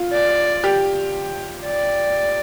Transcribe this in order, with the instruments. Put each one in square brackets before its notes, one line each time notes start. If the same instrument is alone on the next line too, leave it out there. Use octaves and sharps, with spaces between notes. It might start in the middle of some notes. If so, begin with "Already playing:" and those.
Already playing: [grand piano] F4
[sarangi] D5
[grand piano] G4
[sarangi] D5